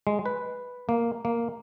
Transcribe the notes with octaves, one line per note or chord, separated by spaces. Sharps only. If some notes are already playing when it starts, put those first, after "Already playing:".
G#3
B4
A#3
A#3